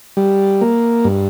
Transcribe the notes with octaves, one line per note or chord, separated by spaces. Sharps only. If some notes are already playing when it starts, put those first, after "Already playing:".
G3
A#3
G2